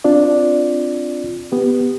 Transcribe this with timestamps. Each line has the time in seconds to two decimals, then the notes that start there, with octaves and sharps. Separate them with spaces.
0.04 C4 D4 F4 D5
1.52 B3 G4